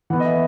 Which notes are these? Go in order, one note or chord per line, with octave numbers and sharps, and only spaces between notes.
E3 B3 F#5
D#5
E5